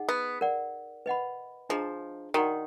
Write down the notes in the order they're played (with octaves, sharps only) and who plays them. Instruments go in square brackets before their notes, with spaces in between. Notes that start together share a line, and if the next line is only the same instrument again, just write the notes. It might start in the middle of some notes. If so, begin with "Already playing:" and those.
Already playing: [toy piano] D#4 G#4 D#5 F#5
[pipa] B3
[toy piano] A#4 D5 F#5
B4 D#5 F#5 B5
[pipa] F3 [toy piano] D4 G#4 D#5 A#5
[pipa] D#3 [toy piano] D#4 F#4 D5 F#5